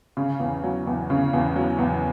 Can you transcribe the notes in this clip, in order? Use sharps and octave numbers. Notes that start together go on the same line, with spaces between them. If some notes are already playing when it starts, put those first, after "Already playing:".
C#3
E2
F#3
E2
C#3
E2
F#3
E2